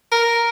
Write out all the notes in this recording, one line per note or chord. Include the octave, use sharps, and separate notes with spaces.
A#4